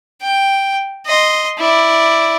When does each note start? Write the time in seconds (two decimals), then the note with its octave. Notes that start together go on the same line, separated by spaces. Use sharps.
0.22 G5
1.06 D#5 C6
1.59 E4 D5